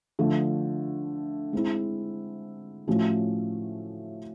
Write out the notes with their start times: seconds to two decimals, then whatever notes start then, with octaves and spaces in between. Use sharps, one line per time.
0.19 D3 F3 A3
1.53 G#3 C4 E4
2.88 A2 F3 A3 C#4 F#4